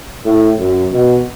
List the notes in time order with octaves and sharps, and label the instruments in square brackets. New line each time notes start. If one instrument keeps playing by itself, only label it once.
[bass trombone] A2
F#2
B2